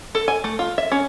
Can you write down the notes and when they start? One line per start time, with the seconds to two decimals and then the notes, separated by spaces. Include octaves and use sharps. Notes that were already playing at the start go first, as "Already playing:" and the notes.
0.15 A4
0.28 G#5
0.44 A3
0.59 F4
0.78 E5
0.92 C#4